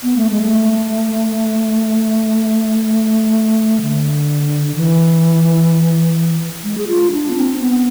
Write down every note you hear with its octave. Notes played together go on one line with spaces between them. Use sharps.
B3
A3
G#3
A3
D3
E3
G#3
G#4
F4
D4
B3
C4
B3